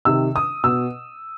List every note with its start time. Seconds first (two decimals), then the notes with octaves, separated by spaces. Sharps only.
0.05 C3 D#3 E6
0.36 D#6
0.64 B2 E6